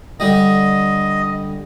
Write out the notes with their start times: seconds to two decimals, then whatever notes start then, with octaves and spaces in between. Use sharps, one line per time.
0.20 D3 G3 D#5